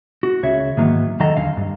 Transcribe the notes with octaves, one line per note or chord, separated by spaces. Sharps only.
F#4
C#2 C#3 C#5 E5
G#2 D#3 E3 F#3 A#3 B3
E2 D#3 F#3 A4 D#5 A#5
D#2 D3 F5
G2